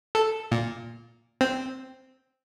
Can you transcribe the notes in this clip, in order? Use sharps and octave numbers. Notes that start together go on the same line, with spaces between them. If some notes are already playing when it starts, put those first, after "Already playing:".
A4
A#2
C4